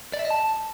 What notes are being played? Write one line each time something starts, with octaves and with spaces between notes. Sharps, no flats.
D5
E5
D#5
A5